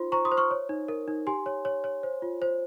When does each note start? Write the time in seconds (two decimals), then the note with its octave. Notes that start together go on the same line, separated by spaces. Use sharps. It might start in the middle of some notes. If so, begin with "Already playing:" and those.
Already playing: D#4 F4 C5 C6
0.12 C5 A#5 C#6
0.25 C6 D#6
0.32 C5
0.37 C#6 F6
0.51 C#5
0.69 D#4
0.88 A#4
1.08 D#4
1.27 G4 G#5 C6
1.46 C#5
1.65 C#5
1.84 C#5
2.03 C5
2.22 F4
2.42 C5